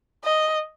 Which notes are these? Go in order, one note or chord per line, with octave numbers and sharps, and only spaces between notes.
D#5